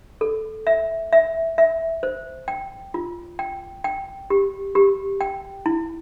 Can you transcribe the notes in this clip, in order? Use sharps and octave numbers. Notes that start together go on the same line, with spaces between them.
A4
E5
E5
E5
C5
G5
F4
G5
G5
G4
G4
G5
E4